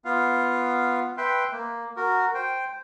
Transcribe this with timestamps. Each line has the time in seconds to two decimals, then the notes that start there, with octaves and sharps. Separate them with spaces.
0.05 B3 F4 F5
1.17 B4 E5 G5 C6
1.53 A#3
1.96 F#4 A#4
2.34 C5 G5